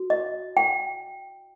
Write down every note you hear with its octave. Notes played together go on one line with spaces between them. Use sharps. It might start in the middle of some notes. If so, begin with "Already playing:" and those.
Already playing: F#4
D#5
G5